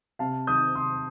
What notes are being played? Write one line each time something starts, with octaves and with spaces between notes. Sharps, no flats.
C3 F5 A5
D#3 D#6 G6
C3 C6 D#6